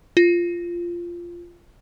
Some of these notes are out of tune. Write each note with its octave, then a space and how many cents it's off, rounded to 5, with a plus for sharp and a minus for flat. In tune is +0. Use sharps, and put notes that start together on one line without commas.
F4 -10